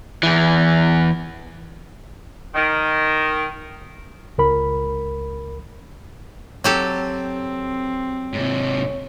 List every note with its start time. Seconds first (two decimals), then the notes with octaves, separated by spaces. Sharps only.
0.23 E2 E3
2.55 D#3
4.38 C#2 A#4 B5
6.64 F#3 C4 G4 A4
8.34 G#2 C3 C#5